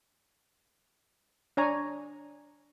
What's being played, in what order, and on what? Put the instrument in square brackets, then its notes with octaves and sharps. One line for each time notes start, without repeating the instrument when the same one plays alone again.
[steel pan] D4 C#5 G#5 A#5